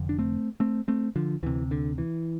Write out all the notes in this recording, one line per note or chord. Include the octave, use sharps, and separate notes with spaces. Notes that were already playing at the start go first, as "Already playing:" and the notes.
Already playing: F1 F2 D3
D4
A3 C4
A3 C4
A3 C4
D3 F3
D2 C3 E3
D3
E3